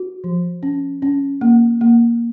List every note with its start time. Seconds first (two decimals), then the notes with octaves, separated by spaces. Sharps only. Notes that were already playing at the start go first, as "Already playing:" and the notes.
Already playing: F#4
0.24 F3
0.63 C#4
1.02 C#4
1.41 A#3
1.81 A#3